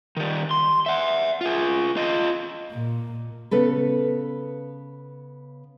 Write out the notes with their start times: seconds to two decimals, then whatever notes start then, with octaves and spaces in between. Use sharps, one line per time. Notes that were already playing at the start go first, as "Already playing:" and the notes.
0.17 D#3 G3
0.51 C6
0.86 E5 F#5
1.41 F4 G#4
1.97 F4 D#5
2.71 A#2
3.51 C#3 B3 A4 B4